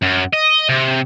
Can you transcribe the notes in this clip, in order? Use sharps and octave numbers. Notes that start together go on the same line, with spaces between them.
F#2
D#5
C3